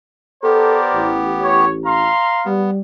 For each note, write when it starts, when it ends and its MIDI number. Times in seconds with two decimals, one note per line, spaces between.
0.44 1.66 59
0.44 1.66 67
0.44 0.81 69
0.44 1.15 70
0.44 1.15 72
0.44 1.15 74
0.94 2.11 33
1.42 1.69 73
1.86 2.46 77
1.86 2.46 82
1.86 2.46 84
2.46 2.81 55
2.46 2.70 59